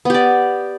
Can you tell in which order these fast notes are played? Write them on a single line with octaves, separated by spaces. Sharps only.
B3 G4 D5